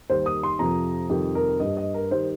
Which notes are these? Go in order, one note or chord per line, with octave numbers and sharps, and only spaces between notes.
D#2 D#3 G3 C5
D#6
C6
F2 C3 F3 A#5
F2 C3 D#3 G3 G4
A#4
G2 G3 D#5
D#5
A#4
D#3 G3 C5